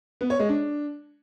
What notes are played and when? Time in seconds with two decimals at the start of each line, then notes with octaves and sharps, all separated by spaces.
0.21 B3
0.30 C#5
0.39 G#3
0.49 D4